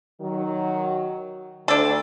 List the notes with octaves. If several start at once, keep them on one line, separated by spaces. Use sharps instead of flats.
D#3 F#3
D2 D4 A4